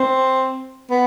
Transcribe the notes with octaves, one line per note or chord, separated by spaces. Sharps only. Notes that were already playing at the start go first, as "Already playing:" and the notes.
Already playing: C4
B3